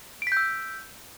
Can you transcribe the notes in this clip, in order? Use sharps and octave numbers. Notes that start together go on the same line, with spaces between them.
E6 G6 B6 D7